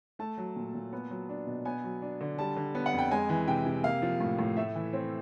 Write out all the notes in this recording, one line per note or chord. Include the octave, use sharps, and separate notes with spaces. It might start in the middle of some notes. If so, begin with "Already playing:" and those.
A3 A5
F#3
A#2
A#2
B3
F#3
D4
B2
B3 G#5
F#3
D4
D3
G3 A5
D3
B3
F#5
F2
G5
G#3 G#5
E3
C3 G5
C3
A#3 F5
F3
A2
A2
A3 E5
E3
C4